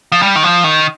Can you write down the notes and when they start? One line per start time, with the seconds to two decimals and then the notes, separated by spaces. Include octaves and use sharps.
0.12 F3
0.22 G3
0.36 D#3
0.43 F3
0.64 D#3